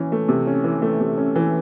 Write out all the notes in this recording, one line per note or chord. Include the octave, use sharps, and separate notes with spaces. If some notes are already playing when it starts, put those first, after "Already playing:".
Already playing: E3 C#4
A3
C3
C#4
E3
A3
C3
C#4
E3